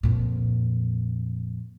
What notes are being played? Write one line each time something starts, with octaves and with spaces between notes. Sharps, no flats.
F2 A#2